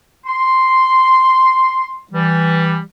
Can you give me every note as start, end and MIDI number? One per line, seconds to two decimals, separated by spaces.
0.26 1.99 84
2.12 2.79 52
2.12 2.79 55